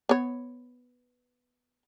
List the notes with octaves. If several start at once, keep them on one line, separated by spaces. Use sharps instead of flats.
B3 C#5